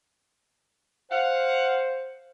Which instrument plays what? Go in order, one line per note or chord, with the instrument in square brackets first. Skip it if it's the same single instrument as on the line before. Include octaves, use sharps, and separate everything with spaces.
[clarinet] C5 [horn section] F5 F#5